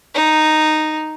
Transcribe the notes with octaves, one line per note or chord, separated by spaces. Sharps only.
D#4